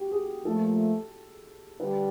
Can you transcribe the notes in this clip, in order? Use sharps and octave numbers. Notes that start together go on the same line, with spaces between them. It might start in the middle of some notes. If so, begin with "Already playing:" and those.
Already playing: F#4 G4
G#4
A#2 F3 A3 A4
D3 G3 B4